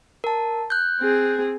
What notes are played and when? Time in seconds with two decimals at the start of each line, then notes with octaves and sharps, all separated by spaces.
0.24 A#4 A5
0.70 F#6 G6
1.00 C4 G#4